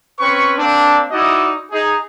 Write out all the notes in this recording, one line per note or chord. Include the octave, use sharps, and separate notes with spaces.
C4 C#4 B4 C#6
A#3 C4 D4
D#4 E4 F#4 D5 D#5
D#4 G#4